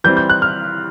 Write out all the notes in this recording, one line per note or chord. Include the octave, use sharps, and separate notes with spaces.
E3 G3 C4 G6
G6
F#6
F6